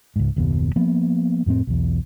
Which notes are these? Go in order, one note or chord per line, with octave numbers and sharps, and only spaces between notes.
C#2 G#2
F#1 D#2 B2
F3 A#3 B3
F2 A2 A#3 C4
B1 E2